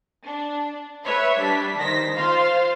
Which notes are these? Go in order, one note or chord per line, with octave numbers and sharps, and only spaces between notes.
D4
B4 C#5 E5
G3 D4 B6
D#3 C5 A#6 B6
F4 C5 F5 C6